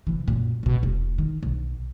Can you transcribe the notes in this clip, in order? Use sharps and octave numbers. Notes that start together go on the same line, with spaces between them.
C3 E3
F#2 A#2
A#1 B2
E1
D#3
B1